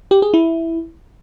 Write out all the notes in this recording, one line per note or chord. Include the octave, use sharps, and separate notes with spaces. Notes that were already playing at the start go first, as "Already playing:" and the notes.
G4
G#4
E4